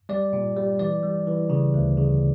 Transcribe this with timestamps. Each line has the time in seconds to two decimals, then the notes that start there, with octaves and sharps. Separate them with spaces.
0.09 G3 D5
0.33 A#2
0.56 G3
0.79 E3 D5
1.03 G3
1.27 E3
1.50 C#3
1.74 D2
1.97 C#3